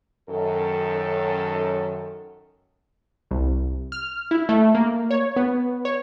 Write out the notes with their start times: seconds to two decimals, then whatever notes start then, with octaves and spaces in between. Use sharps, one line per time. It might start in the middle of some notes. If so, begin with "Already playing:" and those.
0.29 F#2 D#3 A4
3.31 C2
3.92 F6
4.31 E4
4.49 A3
4.75 A#3
5.11 C#5
5.36 B3
5.85 C#5